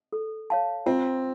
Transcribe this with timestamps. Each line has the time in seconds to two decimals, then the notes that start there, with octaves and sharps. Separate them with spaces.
0.13 A4
0.50 C#5 F5 A5
0.86 C4 F4